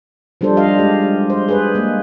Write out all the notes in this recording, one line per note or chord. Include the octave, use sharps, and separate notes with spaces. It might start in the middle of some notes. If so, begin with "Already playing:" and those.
F3 G3 D4 A4 C5
D#5 F5
G#3 G4
C5
G#4 B4
G#3 A#3